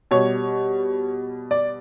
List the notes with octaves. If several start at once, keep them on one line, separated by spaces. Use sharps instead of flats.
B2 G3 C#5
D5